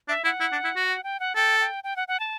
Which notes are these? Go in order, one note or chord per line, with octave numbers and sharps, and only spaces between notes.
D4 E5
E4 F#5
E4
D4
E4
F#4
F#5
G5
F#5
A4 G5
G5
G5
F#5
F#5
A5